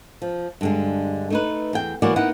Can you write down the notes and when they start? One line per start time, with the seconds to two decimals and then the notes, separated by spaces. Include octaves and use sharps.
0.22 F3
0.61 G2 D3 G#3
1.30 A3 D#4 B4
1.73 E2 G5
2.02 E3 F#3 A#3 B3 F#4 D5
2.16 A#3 B3 D#4 E4 F#5